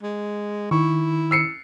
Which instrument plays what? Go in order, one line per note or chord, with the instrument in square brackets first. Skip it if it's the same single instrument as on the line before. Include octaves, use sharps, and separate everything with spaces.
[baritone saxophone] G#3
[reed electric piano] D#3 [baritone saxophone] E4 [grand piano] C#6
[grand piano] E6 C7 C#7